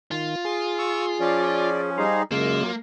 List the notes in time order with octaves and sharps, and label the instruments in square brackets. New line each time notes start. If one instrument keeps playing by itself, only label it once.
[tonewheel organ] D#3 [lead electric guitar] F4
[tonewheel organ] G#4 [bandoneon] D#6
[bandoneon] C#6 E6
[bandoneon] F3 C#4 [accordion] D5
[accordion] G3 D#4 G#4 [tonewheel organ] C5 F5
[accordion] F#2 [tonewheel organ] C#3 G#3 E6 [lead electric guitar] A#3 [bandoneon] F4